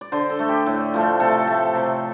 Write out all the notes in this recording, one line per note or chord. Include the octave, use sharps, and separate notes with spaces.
D5
D3 C5
A4
A3
G4
A2
F3 A3
C3 A4
A3
C3